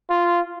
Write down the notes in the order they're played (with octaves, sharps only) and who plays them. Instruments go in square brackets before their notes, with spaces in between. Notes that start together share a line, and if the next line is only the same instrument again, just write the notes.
[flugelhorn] F4